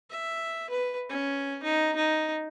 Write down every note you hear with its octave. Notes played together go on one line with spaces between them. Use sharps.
E5
B4
C#4
D#4
D#4